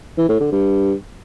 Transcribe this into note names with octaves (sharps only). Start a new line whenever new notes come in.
E3
A2
D3
G2